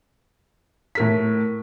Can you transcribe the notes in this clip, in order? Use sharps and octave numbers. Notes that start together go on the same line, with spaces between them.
A2 A#4 B6